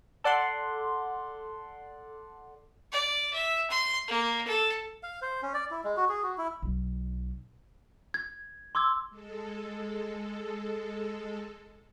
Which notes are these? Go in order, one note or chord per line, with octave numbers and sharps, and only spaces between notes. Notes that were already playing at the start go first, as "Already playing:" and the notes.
A4 D5 F#5 C6
D5
E5
C6
A#3
A4
F5
C5
C#4
D5
E4
G#3
F#4
G#4
F#4
E4
B1 B2
G#6
C6 D6 E6 G#6
G#3 A4